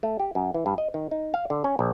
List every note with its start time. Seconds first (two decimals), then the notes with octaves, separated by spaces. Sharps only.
0.03 A3
0.19 G4
0.35 F#2
0.54 E3
0.66 G2
0.78 D#5
0.94 D#3
1.11 D#4
1.34 F5
1.50 D3
1.64 C#4
1.79 A#1